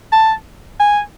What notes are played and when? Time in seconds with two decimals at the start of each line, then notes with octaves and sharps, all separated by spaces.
0.13 A5
0.80 G#5